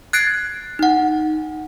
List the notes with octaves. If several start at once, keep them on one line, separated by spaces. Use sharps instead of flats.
F#6 G#6 A6 C7 D7
D#4 F#5